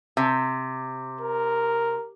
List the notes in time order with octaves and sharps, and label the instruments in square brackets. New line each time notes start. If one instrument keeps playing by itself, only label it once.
[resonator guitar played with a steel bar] C3
[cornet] A#4